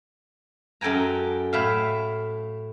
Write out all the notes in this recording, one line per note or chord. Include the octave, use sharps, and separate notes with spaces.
F#2 A4 G5 G#5 A#5
A2 E5 F5